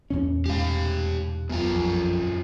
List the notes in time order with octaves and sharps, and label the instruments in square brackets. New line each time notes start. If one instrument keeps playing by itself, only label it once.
[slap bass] E2 A#2 C#4
[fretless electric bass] E1 G#2 [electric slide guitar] G4 F5
[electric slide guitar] F#2 F4 [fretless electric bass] B3
[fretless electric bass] A#1 F2